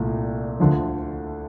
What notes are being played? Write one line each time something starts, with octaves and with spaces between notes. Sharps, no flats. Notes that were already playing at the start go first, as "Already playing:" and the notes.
Already playing: C2 A#2 A3
D2 D3 F3